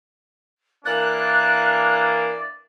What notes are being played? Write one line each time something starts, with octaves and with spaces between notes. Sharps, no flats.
E3 A#3 D4 D5 F#6